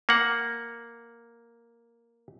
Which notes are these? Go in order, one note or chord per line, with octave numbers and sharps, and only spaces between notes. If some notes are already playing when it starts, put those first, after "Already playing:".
A#3 F#5